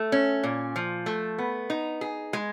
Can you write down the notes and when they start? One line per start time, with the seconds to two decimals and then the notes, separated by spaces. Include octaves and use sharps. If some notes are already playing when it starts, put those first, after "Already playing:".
Already playing: A3
0.12 C#4
0.43 A#2
0.76 F3
1.06 A3
1.38 B3
1.70 D#4
2.01 G#4
2.33 G#3